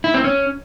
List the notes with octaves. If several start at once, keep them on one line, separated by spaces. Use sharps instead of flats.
E4
C4
C#4